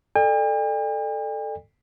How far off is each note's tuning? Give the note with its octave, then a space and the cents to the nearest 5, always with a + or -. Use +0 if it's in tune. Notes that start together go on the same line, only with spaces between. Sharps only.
A4 +0 D5 +35 G5 +45